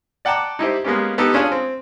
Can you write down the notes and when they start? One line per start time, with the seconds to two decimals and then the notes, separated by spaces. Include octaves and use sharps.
0.25 D5 F#5 G5 A5 A#5 D6
0.59 D#4 E4 G4 C5
0.84 G#3 A#3 B3 C#4 G4
1.18 B3 D#4 G4 A4
1.34 C#4 D4 F4 G#4
1.52 C4